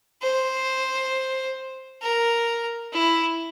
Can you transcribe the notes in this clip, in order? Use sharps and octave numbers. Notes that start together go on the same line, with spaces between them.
C5
A#4
E4